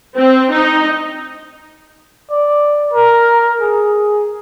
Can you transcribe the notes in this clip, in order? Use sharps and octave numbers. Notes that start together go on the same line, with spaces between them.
C4
D#4
D5
A#4
G#4